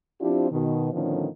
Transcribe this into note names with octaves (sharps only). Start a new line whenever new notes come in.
F3 C4 D4 E4 F4 G4
B2 D#3
A2 D3 D#3 F3 B3 C#4